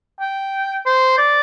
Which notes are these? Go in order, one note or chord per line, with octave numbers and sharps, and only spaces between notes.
G5
C5
D5